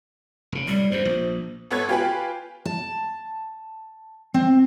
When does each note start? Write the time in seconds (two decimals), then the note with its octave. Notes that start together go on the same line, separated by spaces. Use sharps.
0.52 F1 C#3
0.68 A2 G3
0.92 E2 G2 C5
1.05 A#1
1.71 G#1 B3 A4 C#5 G#6
1.89 F4 G4 B4 G5 G#5 B5
2.65 A5
4.34 C4